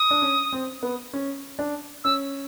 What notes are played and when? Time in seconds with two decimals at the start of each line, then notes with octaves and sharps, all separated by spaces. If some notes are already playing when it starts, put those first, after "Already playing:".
Already playing: D#6
0.11 D4
0.22 C#4
0.53 C4
0.83 B3
1.13 C#4
1.59 D4
2.04 C#4 E6